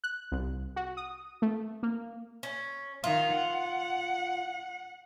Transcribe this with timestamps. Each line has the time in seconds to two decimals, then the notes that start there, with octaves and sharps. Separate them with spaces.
0.04 F#6
0.32 C2
0.76 F#4
0.97 D#6
1.42 A3
1.83 A#3
2.43 C#4
3.04 D#3 F4
3.36 F#5